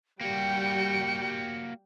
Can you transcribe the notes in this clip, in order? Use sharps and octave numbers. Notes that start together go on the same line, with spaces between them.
G3 A#3 F#4 G5 C#7